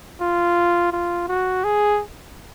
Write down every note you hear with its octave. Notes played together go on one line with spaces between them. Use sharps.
F4
F4
F#4
G#4